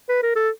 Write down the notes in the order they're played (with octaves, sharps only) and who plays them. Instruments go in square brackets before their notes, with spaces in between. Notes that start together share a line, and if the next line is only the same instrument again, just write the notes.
[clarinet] B4
A#4
A4